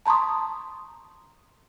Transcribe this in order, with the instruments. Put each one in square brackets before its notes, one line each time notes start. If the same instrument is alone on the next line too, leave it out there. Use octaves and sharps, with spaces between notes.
[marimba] A5 A#5 C6 C#6 D#6